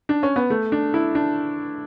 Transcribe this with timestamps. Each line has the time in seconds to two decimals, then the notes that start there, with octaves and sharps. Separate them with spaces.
0.09 D4
0.23 C#4
0.36 B3
0.50 A3
0.72 D4
0.94 E4
1.15 D4